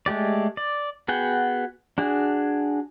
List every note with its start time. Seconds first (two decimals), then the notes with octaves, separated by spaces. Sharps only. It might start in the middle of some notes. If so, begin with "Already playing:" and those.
0.06 G#3 A3 G4 D5
0.57 D5
1.08 B3 F#4 G#4 F#5 G5
1.98 D4 F#4 G#4